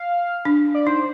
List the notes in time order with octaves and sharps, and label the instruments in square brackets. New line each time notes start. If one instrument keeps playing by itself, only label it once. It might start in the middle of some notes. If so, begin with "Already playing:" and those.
Already playing: [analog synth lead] F5
[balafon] D4
[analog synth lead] D5
[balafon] D#4 [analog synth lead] C5